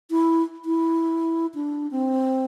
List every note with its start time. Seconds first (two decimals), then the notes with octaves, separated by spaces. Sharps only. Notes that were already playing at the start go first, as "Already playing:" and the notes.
0.11 E4
0.65 E4
1.55 D4
1.91 C4